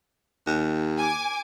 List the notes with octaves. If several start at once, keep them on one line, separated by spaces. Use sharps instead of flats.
D#2
G#5 D6